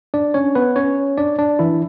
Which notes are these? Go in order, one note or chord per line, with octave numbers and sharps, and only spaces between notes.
D4 D5
C#4 C#5
B3 B4
C#4 C#5
D4 D5
D4 D5
E3 E4